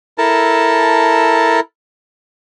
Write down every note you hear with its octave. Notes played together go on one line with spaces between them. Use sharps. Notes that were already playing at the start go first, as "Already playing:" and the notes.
E4 A4 A#4 A5